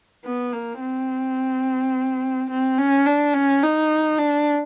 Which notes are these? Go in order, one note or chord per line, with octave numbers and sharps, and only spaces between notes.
B3
A#3
C4
C4
C#4
D4
C#4
D#4
D4